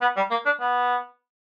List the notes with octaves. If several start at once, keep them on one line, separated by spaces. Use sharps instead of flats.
B3
G3
A#3
D4
B3